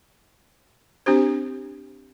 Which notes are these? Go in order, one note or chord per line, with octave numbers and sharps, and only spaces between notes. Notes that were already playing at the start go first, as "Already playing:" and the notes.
C4 D4 G4 C5